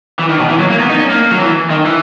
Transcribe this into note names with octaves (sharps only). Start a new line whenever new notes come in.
E3
D#3
B2
E3
F#3
A#3
B3
D#4
C#4
A#3
F#3
E3
D#3
E3